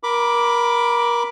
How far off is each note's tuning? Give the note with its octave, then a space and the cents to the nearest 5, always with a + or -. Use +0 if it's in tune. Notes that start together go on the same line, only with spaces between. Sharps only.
A#4 +25 B5 +0 D6 +0